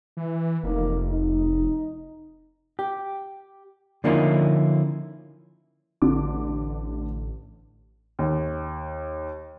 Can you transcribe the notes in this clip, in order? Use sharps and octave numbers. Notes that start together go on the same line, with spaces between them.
E3
F1 A#3 D#4
D#4
G4
D3 F3 A#3 C#4 D#4 E4
A1 D3 D6
D#2